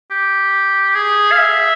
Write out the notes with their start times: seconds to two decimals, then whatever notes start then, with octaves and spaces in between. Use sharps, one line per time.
0.11 G4
0.96 G#4
1.32 F5
1.38 E5